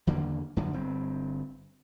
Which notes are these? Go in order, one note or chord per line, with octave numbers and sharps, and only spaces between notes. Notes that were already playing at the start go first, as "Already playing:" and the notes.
E2 D3 D#3 A#3
F#2 D3 F3 F#3
G1 G2 C4